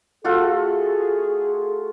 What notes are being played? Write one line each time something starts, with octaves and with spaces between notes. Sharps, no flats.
A3 F4 F#4 G#4